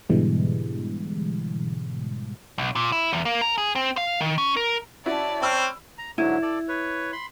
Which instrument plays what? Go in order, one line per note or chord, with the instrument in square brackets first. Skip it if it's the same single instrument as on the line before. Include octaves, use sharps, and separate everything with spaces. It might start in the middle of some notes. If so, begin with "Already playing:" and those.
[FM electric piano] G#2 B2 D3 E3 G3 G#3
[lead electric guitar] B1
A#2
E4
E2
A#3
A#4
G#4
C4
F5
D#3
C#4
A#4
[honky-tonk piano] C#4 E4 F#4 [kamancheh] D5 A5
[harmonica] C4 C5 C#5 [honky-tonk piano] B5 E6 F6
[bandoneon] A#5
[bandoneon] G#2 D3 F#3 [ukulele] E4
[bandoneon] A4 D5
B4 C#5
B5 C6